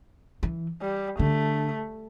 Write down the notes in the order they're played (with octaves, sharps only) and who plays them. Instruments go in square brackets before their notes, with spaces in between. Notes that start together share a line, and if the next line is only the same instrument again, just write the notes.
[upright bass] E3
[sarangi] G3
[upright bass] D3 [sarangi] A3